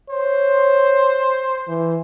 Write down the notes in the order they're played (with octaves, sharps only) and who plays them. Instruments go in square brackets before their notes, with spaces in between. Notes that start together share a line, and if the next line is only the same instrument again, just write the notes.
[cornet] C5 [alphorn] C#5
[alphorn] E3